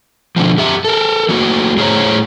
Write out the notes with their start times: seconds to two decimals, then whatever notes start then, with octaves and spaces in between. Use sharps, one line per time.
0.36 B2 D3 F3
0.57 F#2 G4 E5
0.85 A4 A#4
1.29 F#3 A3 A#3 F#4
1.77 A2 G#4 C5 C#5 A#5